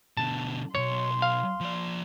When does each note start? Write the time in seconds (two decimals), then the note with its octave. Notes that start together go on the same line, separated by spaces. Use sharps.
0.17 B2 D3 A5
0.75 B1 E2 C#5 C6
1.22 F5
1.61 F3 D5